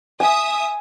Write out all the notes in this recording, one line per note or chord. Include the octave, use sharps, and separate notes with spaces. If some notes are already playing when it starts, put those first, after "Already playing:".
E5 G#5 D#6